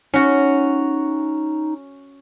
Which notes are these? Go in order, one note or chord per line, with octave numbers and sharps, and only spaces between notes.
C#4 D#4 F#4